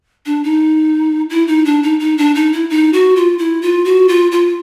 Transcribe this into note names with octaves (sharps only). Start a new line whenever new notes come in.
D4
D#4
E4
D#4
D4
D#4
D#4
D4
D#4
E4
D#4
F#4
F4
E4
F4
F#4
F4
F4